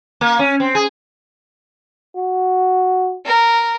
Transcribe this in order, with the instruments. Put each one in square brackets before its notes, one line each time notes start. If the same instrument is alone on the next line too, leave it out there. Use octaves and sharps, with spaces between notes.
[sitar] A#3
C#4
C4
G#4
[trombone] F#4
[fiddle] A#4